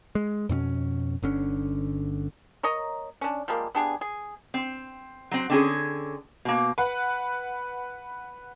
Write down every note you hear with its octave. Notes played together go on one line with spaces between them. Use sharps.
G#3
F2 B2 C4 C#4
G1 D3 C#4
A#4 C#5 D#5 A#5
C#4 D4
F3 G3 G#3 A#3
B3 D4 G4 G#4
G#4
C4
F#3 C4
D3 C4 C#4 G#4
B2 A#3
B4 F#5